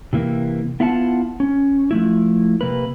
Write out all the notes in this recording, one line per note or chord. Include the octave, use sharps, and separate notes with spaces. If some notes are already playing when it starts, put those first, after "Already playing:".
C3 E3 A#3
B3 E4 F4 F#5 A5
C#4
F3 A3 E4
C3 A#3 B4